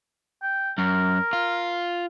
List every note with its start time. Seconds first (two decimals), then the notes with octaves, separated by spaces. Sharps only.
0.42 G5
0.78 F#2 A#4
1.33 F4